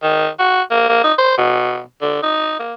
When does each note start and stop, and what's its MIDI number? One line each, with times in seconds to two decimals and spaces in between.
0.03 0.27 51
0.39 0.61 66
0.71 0.84 58
0.89 1.04 58
1.04 1.13 63
1.18 1.35 72
1.37 1.81 47
2.01 2.19 50
2.23 2.56 63
2.59 2.74 58